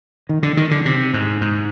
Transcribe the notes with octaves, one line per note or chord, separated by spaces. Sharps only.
D#3
D3
D#3
D3
C3
G#2
G#2